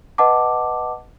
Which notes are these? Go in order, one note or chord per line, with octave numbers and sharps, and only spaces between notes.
B4 D#5 F#5 A5 D6